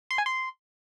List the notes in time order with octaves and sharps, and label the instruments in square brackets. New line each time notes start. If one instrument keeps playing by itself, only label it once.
[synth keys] C6
G#5
C6